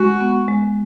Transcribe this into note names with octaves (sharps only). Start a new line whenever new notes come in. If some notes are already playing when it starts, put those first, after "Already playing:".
Already playing: G#3 F#4
B3
G#3